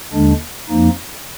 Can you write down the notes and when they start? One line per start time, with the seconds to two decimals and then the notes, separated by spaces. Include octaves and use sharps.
0.13 D#2 D3 G#3 D4
0.69 F2 F3 A#3 D#4